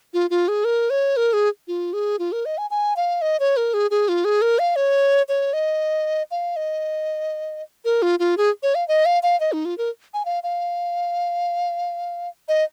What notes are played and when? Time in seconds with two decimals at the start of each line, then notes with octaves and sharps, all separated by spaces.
0.14 F4
0.30 F4
0.48 G#4
0.65 A#4
0.90 C#5
1.17 A#4
1.33 G#4
1.68 F4
1.93 G#4
2.19 F4
2.32 A#4
2.46 D#5
2.58 G#5
2.71 G#5
2.97 F5
3.22 D#5
3.40 C#5
3.57 A#4
3.74 G#4
3.91 G#4
4.09 F4
4.25 G#4
4.42 A#4
4.59 F5
4.76 C#5
5.29 C#5
5.53 D#5
6.31 F5
6.56 D#5
7.85 A#4
8.02 F4
8.19 F4
8.37 G#4
8.63 C#5
8.75 F5
8.88 D#5
9.05 F5
9.23 F5
9.40 D#5
9.52 D#4
9.65 F4
9.78 A#4
10.14 G#5
10.25 F5
10.43 F5
12.48 D#5